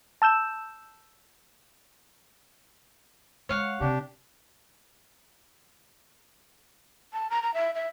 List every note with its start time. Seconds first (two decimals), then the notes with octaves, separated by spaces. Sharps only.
0.22 A5 E6 G6 E7
3.49 G#3 C#5 F5 F#5
3.81 C3 D4 G4
7.13 A5
7.30 A#5
7.42 A#5
7.54 E5
7.75 E5